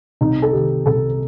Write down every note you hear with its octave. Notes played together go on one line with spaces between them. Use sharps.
C2 D#4
A4
C3 D#3 G4
C2 A4